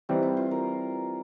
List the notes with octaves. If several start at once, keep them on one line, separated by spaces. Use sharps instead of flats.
E3 G3 C4 D#4
E4
F4
A#4